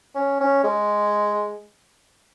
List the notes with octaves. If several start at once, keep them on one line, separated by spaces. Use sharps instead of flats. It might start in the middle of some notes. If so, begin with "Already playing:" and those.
C#4
C#4
G#3